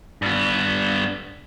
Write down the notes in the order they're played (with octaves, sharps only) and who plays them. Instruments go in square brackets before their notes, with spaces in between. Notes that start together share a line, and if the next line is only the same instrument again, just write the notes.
[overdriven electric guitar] G2 B3